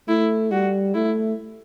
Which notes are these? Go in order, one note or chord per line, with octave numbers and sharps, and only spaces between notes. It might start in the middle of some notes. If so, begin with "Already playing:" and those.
A3 E4
G3 F#4
A3 E4